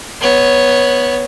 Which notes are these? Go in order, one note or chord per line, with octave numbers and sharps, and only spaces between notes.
B3 C#5